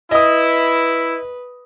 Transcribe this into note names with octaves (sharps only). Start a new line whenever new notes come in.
E4 B4 D#5 D#6